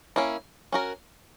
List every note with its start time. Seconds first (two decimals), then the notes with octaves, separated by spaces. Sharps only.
0.16 A#3 C#4 E4
0.72 C#4 F#4 A#4